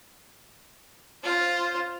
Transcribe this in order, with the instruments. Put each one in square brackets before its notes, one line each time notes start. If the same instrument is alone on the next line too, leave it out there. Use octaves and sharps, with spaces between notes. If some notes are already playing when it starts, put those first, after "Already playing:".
[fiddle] F4 C5